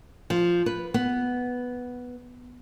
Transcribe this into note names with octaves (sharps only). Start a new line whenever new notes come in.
F3
B4
B3